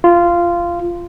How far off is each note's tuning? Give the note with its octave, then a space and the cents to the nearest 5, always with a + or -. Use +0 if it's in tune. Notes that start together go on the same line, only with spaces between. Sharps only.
F4 -15